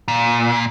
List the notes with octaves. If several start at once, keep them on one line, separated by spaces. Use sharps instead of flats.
A#2